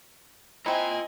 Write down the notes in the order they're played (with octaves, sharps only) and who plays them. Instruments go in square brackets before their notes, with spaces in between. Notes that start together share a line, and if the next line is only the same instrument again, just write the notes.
[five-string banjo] C4 E4 [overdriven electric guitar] F4 A#5 [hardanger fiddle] D#5 G#5